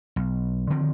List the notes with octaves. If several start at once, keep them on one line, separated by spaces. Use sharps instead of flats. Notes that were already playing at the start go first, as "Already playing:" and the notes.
B1
D3 D#3 F3 C4